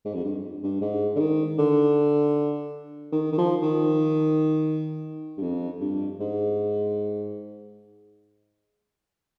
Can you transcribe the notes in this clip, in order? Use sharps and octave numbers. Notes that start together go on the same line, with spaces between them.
G#2
F2
G2
G2
G#2
D3
D#3
D3
D#3
D#3
F3
D#3
G2
F2
G2
G#2